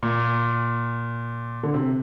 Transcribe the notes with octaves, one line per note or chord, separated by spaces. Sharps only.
A#2
D3
C3